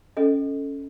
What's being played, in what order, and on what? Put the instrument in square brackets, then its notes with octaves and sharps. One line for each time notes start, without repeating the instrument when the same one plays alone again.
[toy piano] C#4 A4 D#5